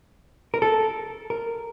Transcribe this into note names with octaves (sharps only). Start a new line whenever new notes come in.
A#4
A4
A#4